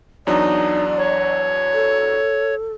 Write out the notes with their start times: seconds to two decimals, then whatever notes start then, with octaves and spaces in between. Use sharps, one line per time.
0.27 E2 F#3 D4 D#4 D5
0.98 C#5
1.74 A4